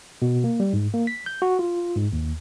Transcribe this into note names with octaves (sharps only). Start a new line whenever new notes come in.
B2
A#3
G3
G#2
A#3
B6
G6
F#4
F4
G#2
D#2